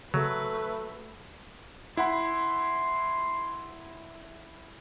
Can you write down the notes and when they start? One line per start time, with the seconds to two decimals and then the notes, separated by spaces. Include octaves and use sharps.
0.14 C#3 F#3 A3 B4
1.97 E4 F#5 B5 C6